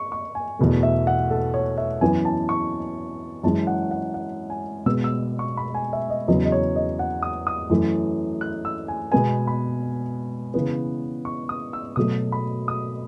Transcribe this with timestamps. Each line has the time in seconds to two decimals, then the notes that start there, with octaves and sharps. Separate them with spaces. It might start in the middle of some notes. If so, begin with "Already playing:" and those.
Already playing: C#6
0.12 C#6
0.35 G#5
0.59 E2 B2 A3
0.83 E5
1.07 F#5
1.31 A4
1.54 C#5
1.78 E5
2.01 F#2 E3 B3 G#5
2.25 A5
2.49 C#6
3.43 F#2 E3 G#3 A5
3.67 F#5
3.91 F#5
4.14 F#5
4.50 G#5
4.86 B2 G#3 B3 E6
5.04 E6
5.39 C#6
5.57 B5
5.75 G#5
5.93 E5
6.10 D#5
6.28 E2 C#3 F#3 B3 D#5
6.45 D#5
6.52 C#5
6.76 D#5
6.99 F#5
7.23 D#6
7.47 D#6
7.70 F#2 E3 A3
8.41 F#6
8.65 E6
8.88 G#5
9.12 B2 G#3 B3 G#5
9.47 B5
10.54 C#3 E3 B3
11.25 C#6
11.49 D#6
11.73 E6
11.96 B2 F#3 A3 D#6
12.32 B5
12.68 D#6